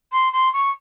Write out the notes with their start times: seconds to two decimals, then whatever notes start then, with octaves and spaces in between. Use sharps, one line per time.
0.12 C6
0.33 C6
0.53 C#6